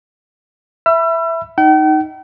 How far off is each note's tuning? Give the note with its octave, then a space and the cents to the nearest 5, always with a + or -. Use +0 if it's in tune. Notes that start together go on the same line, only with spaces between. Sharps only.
E5 +0 B5 +0 E6 +35
D#4 +0 G5 -45